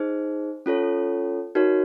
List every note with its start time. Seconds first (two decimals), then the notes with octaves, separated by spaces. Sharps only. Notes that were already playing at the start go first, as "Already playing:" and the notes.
Already playing: D#4 G#4 C5
0.66 C#4 F4 A4 C#5
1.55 D#4 F#4 A#4 C#5